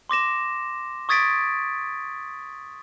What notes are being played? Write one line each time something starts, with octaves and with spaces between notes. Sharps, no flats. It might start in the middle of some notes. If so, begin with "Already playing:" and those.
C6 D6 A#6 E7
C#6 D#6 G#6 A6 B6 D7